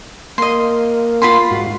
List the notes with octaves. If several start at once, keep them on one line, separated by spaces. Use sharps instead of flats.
A#3 D#5 C6
F4 B5 C6
G#2 F#4